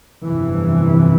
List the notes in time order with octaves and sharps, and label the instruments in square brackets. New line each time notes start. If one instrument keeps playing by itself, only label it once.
[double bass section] G1 F2 C3 E3